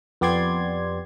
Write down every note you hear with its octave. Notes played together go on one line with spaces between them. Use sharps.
F2 B3 G4 D5 C6 G#6